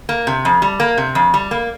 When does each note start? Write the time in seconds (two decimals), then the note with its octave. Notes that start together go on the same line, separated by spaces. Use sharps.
0.09 A#3
0.27 C3
0.45 F2
0.62 G3
0.80 A#3
0.98 C3
1.15 F2
1.34 G3
1.51 A#3